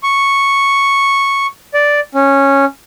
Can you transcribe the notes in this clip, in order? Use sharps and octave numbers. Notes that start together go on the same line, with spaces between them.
C#6
D5
C#4